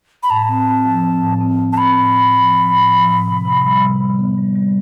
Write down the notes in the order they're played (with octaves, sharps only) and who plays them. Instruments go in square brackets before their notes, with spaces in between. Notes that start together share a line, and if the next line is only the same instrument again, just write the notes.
[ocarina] B5
[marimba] A2 [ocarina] A5
[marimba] C4
C4
F3
C4
A2
C4
A2
[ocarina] A5
[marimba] C4 [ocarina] B5
[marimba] A2
A2
F3
F3
A2
F3
A2
C3
C3
G3
C3
G3
B3
G3
G3